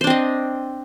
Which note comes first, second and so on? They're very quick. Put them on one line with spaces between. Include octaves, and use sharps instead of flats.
C5 D4 C4 D#5